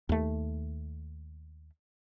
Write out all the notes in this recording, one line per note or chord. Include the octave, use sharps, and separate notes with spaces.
D#2 A3